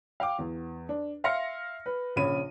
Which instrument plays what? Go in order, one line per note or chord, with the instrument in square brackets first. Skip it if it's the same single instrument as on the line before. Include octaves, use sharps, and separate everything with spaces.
[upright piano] F5 G5 D6
E2
D4
E5 F5 C6 F6 A#6 C#7
B4
A#1 C#3 C#5 B5 D#7